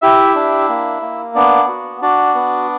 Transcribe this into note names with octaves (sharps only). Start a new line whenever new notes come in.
E4 G4 E5
D4
A#3
A#3
B3 D4 D5
F#4
D4 F#4 D5
B3